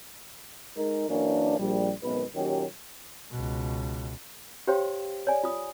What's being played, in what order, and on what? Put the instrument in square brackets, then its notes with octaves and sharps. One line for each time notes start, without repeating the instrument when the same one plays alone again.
[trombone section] G#3 D#4 A#4
F#2 E3 A#3 C#4 D4
A#1 G3
G#1 F#2 B2 G#3 B3 B4
A#2 D#3 F#3 C#4 G4
[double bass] C#2 B2
[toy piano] G4 C5 C#5 F5 G5 C6
C#5 D5 G#5
F4 D#6